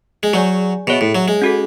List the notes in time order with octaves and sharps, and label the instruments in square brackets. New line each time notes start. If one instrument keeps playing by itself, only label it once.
[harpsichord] G#3
[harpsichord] F#3 [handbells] G#4 D5 G#5
[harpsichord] B2 [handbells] G#4 C#5 E5
[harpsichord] A2
F#3
G#3
[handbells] C#4 F#4 A4